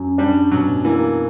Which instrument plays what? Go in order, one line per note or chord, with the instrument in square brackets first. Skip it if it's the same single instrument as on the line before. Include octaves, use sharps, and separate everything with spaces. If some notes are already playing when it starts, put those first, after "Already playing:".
Already playing: [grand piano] F#2
[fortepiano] G3 [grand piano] D4
[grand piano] B2 [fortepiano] F#3
[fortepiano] E3 [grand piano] A#3